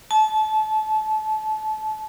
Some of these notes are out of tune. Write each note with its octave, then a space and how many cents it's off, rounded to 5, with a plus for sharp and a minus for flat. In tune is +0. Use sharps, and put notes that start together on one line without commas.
A5 -25